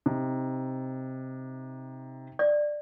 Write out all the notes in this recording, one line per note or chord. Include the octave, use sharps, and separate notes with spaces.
C3 D#4
D5